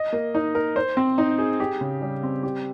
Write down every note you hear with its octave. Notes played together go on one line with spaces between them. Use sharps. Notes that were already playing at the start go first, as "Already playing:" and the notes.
Already playing: D#5
A#3
D#4
A#4
C5
C4
D#4
G#4
G4
C#3
G3
C4
G4